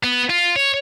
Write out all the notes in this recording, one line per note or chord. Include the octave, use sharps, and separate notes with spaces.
B3
F4
C#5